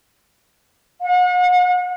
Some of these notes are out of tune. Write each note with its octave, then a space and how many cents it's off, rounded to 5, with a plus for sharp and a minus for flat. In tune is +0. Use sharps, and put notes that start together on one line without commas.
F#5 -40